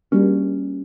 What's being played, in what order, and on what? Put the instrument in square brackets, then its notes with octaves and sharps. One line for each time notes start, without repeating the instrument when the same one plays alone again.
[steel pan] G3 A#3 D4 F#4 A#4 [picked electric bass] C#4